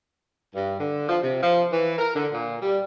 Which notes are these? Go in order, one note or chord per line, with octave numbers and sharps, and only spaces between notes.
G2
D3
F3
C3
F3
E3
A#4
D3
A#2
G3